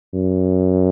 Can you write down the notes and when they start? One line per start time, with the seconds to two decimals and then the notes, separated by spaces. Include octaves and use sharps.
0.14 F#2